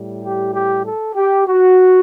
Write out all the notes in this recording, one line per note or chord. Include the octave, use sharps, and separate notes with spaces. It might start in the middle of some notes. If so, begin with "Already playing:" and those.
Already playing: A2 G3
G4
G4
A4
G4
F#4